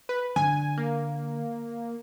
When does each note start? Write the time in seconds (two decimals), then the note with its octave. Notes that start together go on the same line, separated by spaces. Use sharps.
0.09 B4
0.36 D3 G#5
0.78 A#3